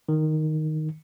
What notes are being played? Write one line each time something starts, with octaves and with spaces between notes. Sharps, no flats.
D#3